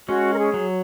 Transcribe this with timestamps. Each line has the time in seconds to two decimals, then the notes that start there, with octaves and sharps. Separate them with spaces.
0.08 G#3 C#4 F#4
0.34 A#4
0.39 G#4
0.54 F#3